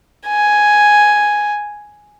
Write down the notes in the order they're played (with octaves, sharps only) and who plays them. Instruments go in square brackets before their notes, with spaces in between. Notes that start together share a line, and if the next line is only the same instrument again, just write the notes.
[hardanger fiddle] G#5